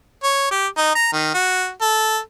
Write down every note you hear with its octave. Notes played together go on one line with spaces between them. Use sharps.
C#5
G4
D#4
A#5
D#3
F#4
A4